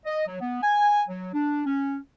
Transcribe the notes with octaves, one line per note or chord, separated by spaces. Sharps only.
D#5
F#3
B3
G#5
F#3
D4
C#4